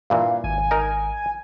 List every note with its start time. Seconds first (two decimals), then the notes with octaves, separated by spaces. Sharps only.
0.10 G2 A#2 E3 F5
0.44 G#1 G#5
0.71 D#4 A#4